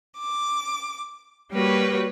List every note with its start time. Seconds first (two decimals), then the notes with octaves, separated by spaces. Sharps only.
0.18 D6
1.52 G3 A#3 F#4 G4 B4 C#5